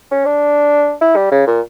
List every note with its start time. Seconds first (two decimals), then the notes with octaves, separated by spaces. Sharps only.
0.11 C#4
0.25 D4
1.01 E4
1.16 G3
1.31 C#3
1.47 A#2